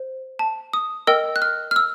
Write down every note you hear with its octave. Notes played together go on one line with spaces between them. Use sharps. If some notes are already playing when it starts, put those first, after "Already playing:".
Already playing: C5
A5
D#6
A#4 D#5 G5 E6
F#6
F6
F6
E6